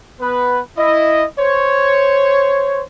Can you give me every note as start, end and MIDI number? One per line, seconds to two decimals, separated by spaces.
0.20 0.60 59
0.20 0.60 71
0.78 1.25 64
0.78 1.25 75
1.40 2.82 72
1.40 2.82 73